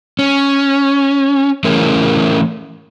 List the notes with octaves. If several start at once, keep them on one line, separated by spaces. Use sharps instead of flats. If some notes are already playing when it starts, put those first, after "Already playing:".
C#4
E3 A3 C#4 E4 G#4 A#4